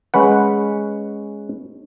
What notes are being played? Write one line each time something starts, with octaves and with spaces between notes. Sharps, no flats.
G#3 C#4 B4 F#5